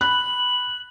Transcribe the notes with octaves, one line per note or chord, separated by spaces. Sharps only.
B5 F#6 F#7